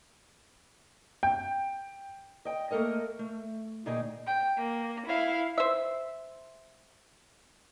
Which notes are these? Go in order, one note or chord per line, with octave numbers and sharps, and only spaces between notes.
G5
D#5 G5
A3 A#3 A4 A#4 D#5
A3
D2 A#2 D#4 G#4 D#5 G5
G5
A#3
E4 F5
C5 E5